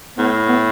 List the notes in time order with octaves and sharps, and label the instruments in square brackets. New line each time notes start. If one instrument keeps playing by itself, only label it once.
[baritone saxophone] A2 [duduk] B3
[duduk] B3